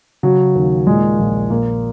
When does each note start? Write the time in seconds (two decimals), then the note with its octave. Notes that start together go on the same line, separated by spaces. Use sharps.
0.23 C#3 F#3
0.55 D#2
0.87 A#2 G#3
1.19 A#1
1.50 A#2 A#3